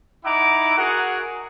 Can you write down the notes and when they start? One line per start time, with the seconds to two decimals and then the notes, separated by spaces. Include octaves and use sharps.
0.24 D#4 E4 E5 F#5 A#5 D6
0.77 F#4 G#4 A#4 F#5